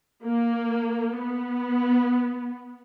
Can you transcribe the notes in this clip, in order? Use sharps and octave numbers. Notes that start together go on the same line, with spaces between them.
A#3
B3